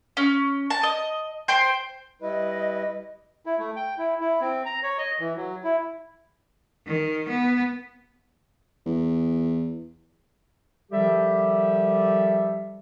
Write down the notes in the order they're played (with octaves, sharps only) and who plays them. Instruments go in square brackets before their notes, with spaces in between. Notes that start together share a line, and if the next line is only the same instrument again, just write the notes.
[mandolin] C#4
A5
D#5
C5 G5 C6
[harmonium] G3 E4 B4 [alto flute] D#5
[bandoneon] E4
A3
G5
E4
E4
C4
A#5
C#5
D#5
E3
F#3
E4
[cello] D#3
B3
[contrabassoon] E2
[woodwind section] D#3 F3 G3 G4 A4 E5